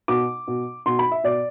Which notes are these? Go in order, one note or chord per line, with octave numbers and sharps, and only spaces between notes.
B2 D6
B2
B2 C6
B5
E5
B2 D5